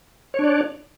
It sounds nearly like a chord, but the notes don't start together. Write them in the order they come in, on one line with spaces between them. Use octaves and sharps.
C#5 D4 D5